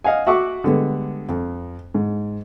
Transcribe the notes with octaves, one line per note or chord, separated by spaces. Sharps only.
D#5 F5 F#5 G#5
F#4 E5 F#5 C#6 D6
D3 G3 G#3 B3
F2
G#2